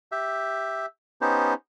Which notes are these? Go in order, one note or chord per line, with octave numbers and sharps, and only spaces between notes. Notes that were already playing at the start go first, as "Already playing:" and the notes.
G4 E5
B3 C#4 D#4 G4 C5